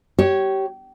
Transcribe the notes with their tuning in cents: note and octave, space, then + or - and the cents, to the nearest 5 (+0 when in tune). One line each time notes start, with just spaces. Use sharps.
G4 -25 C#5 +0